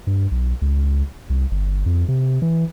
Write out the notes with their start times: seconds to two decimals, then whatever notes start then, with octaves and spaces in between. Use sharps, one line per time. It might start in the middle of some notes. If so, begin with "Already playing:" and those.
0.07 G2
0.31 B1
0.62 C#2
1.30 C2
1.51 G1
1.86 F2
2.08 C3
2.42 E3